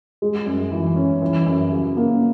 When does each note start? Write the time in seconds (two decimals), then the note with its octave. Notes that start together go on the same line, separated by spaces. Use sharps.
0.22 G#3
0.46 F#2
0.72 E3
0.96 C#4
1.22 E3
1.46 F#2
1.72 C#3
1.97 A#3